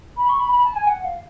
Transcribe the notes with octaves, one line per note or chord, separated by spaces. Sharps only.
B5
C#6
B5
B5
A5
G#5
F#5
F5